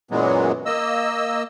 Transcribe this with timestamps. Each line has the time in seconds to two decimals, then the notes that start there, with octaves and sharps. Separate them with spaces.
0.11 F#2 A#2 E3 F#3 G#3 B3
0.65 A#3 D#5 E6